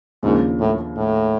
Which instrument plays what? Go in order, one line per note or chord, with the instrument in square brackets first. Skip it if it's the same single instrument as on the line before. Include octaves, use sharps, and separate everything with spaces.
[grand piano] D#2 C#3 F3 A#3 D4 [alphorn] G#2
[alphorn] A2
A2